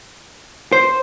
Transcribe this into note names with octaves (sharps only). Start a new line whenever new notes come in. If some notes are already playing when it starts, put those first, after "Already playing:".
C5